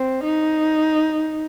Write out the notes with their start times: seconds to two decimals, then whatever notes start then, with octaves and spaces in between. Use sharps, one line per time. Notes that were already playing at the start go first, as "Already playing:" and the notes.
Already playing: C4
0.23 D#4